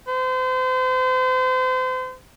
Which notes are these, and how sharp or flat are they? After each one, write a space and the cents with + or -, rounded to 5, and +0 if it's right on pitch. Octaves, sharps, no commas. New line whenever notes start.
C5 -35